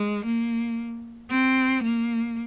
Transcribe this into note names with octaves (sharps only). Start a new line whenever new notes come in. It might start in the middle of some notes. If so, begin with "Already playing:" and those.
Already playing: G#3
A#3
C4
A#3